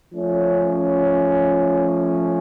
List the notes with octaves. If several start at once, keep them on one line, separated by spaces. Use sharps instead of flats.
F3 A3 C#4